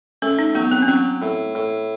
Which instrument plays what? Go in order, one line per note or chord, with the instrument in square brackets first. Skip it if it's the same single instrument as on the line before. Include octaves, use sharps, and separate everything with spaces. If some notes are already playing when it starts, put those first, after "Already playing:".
[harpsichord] A3 [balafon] C#4
[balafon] D#4
[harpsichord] F#3 [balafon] B3
[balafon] C4
C#4
[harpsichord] F#3 [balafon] C4
[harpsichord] A2
A2